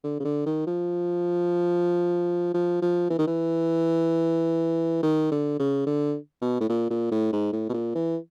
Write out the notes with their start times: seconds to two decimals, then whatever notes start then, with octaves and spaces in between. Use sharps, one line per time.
0.04 D3
0.20 C#3
0.25 D3
0.46 D#3
0.67 F3
2.54 F3
2.82 F3
3.10 E3
3.19 D#3
3.27 E3
5.03 D#3
5.32 D3
5.59 C#3
5.86 D3
6.41 B2
6.60 A2
6.70 A#2
6.90 A#2
7.12 A2
7.32 G#2
7.53 A2
7.69 B2
7.74 A#2
7.95 E3